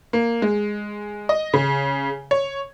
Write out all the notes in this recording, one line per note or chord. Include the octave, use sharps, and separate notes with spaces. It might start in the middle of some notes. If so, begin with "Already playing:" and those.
A#3
G#3
D#5
C#3
C#5